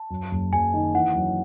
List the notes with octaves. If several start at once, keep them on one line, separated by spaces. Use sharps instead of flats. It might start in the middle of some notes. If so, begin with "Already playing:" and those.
Already playing: A5
F#2
F#1
F#1 G#5
D#3
E3 F#5
F#2